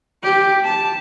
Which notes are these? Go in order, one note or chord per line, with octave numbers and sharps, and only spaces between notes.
G4
A5